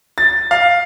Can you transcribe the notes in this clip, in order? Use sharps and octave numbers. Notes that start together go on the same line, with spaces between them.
A6
F5